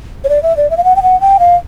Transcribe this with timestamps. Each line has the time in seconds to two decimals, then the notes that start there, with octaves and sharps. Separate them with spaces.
0.24 C#5
0.29 D5
0.43 E5
0.57 D5
0.70 E5
0.77 F5
0.84 F#5
0.96 G5
1.03 F#5
1.21 G5
1.39 F5